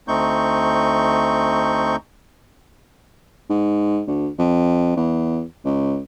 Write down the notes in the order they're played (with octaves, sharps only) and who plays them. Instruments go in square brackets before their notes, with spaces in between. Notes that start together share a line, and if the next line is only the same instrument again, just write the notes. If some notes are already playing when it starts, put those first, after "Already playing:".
[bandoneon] D2 A3 C4 D#4 C#6 G6
[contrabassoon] G#2
D2
F2
E2
C#2